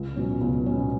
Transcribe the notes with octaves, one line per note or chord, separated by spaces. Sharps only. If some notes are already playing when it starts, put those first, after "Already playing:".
Already playing: C#2
B2 F#3 C#4
C#2 B3
B2 F#3 C#4